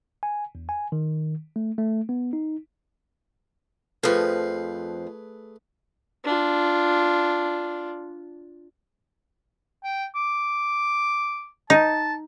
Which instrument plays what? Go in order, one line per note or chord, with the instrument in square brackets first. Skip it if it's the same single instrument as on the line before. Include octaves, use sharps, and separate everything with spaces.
[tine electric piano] G#5
E2
G#5
D#3
A3
A3
B3
D#4
[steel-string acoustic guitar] F2 F3 [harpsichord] A3 G#4 B4
[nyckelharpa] D4 F4
[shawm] G5
D6
[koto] D#4 [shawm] A5